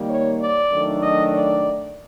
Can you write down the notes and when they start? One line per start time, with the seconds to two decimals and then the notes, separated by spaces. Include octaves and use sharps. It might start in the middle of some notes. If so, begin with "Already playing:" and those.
Already playing: D#3 G3 A#3
0.10 C#5
0.41 D5
0.72 D#3 F#3 A3 D4
1.02 D#5
1.34 D5